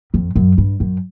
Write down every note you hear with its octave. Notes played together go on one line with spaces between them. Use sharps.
F2
F#2
G2
F#2